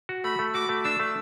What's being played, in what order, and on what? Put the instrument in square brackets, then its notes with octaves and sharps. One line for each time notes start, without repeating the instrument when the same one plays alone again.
[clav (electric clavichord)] F#4
[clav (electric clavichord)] A3 [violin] B5
[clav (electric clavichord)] A3
[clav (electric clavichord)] F#4 [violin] D6
[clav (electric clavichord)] A3
[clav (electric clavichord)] D4 [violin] E6
[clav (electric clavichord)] A3